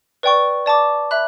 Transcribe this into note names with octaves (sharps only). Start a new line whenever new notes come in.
B4 D5 G5 C#6
D5 A5 D6
E5 B5 F#6